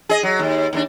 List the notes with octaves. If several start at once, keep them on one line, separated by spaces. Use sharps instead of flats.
G#4 D#5
F#3
D#2
D#2 D#3 D4